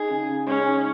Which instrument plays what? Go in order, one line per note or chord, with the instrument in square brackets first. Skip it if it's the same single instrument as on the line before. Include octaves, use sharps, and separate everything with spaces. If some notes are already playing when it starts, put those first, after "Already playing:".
Already playing: [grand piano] D#4 [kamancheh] G#4
[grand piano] C#3
C#3
[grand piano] G#3 [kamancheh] C#4
[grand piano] D#4